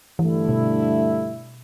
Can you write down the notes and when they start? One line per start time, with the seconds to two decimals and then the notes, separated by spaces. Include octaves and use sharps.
0.19 G2 D3 E3 A3 E4
0.49 B2